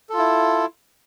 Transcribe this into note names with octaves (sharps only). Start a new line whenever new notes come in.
E4 F4 A4